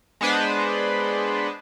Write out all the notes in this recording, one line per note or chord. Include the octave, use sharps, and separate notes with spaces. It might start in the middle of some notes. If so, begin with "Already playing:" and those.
G#3 B3 D4 B4 C5